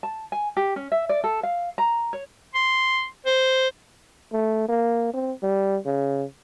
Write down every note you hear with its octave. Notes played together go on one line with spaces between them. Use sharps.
A5
G#5
G4
C#4
E5
D5
A4
F5
A#5
C#5
C6
C5
A3
A#3
C4
G3
C#3